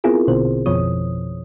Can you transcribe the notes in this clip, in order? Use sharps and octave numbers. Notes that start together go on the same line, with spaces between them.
B3 C4 E4 F4 G#4 A#4
A#1 B2 D3 C4 C5
G#1 F2 B2 F3 C#5 D#6